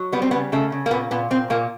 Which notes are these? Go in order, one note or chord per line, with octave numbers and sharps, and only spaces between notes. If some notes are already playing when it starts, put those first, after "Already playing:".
Already playing: F#3
G3 B3
C4
C#3 B3
C#3 A3
C#3
A#3
A#2 B3
A#2 B3
A#2 C4
A#2 A#3